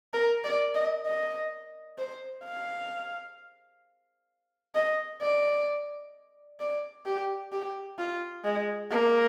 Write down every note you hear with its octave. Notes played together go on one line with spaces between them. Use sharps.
A#4
D5
D#5
D#5
C5
F5
D#5
D5
D5
G4
G4
F4
G#3
A#3